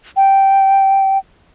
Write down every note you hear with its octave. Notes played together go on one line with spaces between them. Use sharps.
G5